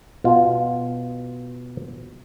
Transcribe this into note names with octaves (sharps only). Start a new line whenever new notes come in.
B2 F4